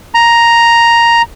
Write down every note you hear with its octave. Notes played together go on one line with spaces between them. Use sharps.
A#5